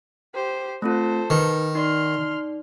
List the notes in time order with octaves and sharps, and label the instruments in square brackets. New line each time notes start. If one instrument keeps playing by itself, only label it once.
[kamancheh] G4 C5
[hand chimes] A3 C4 F4 [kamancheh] A4 C5
[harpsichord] D#3 [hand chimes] D#4 B4
[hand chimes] D#4 D5 [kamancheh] C6 F6